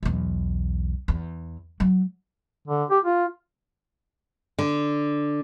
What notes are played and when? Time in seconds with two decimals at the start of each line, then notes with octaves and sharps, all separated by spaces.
0.03 B1 E2
1.08 E2
1.80 F#3
2.67 D3
2.90 G4
3.04 F4
4.59 D3